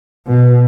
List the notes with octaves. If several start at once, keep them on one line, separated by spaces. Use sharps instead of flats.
B2